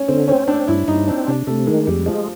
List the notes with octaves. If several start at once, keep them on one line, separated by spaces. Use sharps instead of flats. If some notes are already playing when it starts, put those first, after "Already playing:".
Already playing: C#4
D3 C4
C4 C#4
C4 D4
G2 E4
G2 D#4
C4 D4
C3 D4
C3 A3
D#3 G#3
F2 G3
F3 G#3